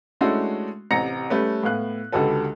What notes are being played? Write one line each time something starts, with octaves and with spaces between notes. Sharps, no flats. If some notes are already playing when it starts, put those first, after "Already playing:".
G#3 A3 C#4 D4 E4 F#4
A1 C3 A#5 A#6 C#7
G3 A3 C#4 B4
A2 B3 F5 F#6
C#2 D3 F#4 G4 A4 B4